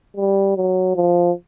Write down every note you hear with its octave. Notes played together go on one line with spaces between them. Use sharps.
G3
F#3
F3